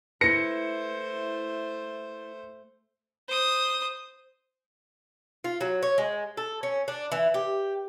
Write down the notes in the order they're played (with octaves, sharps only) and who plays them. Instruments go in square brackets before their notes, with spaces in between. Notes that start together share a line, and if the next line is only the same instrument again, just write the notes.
[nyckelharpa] A3 C5 [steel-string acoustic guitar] E4 B4 [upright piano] A#6 C#7
[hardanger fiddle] C5 D#6
[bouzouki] F4
F#3
C#5
G#3
A4
C#4
D4
E3
G4